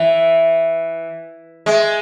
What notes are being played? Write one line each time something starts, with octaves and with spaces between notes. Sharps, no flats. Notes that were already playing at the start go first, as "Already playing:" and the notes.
Already playing: E3
G#3